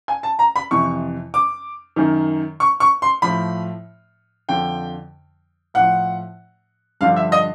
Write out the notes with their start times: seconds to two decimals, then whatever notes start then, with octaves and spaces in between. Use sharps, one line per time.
0.08 G#5
0.23 A5
0.39 A#5
0.56 B5
0.71 F2 C3 E3 C#6
1.34 D6
1.96 F#2 D#3
2.60 C#6
2.80 C#6
3.02 C6
3.22 A2 F3 B5
4.49 F2 D3 F3 G5
5.74 A2 F3 F#5
7.01 G2 D3 F3 F5
7.16 E5
7.32 D#5